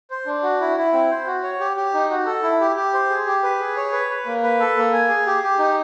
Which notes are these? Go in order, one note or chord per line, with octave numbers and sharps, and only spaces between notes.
C5
D4
F#4
E4
E4
C4
C5
F#4
C#5
G4
G4
D#4
F#4
A4
E4
G4
G4
C5
G#4
G4
B4
G#4
C#5
B4
B4
A#3
B4
A4
A#3
G#5
G#4
G4
G4
D#4